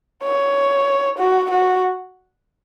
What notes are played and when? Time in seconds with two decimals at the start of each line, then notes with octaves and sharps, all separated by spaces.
0.24 C#5
1.19 F#4
1.51 F#4